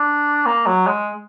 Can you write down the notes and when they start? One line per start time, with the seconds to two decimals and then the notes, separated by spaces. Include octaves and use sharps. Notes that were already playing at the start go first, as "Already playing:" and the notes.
Already playing: D4
0.46 A#3
0.67 F#3
0.87 G#3